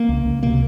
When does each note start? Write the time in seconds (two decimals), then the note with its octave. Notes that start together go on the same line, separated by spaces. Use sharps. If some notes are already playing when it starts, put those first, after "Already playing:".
Already playing: A#3
0.09 C#2
0.26 C#2
0.43 C3 A#3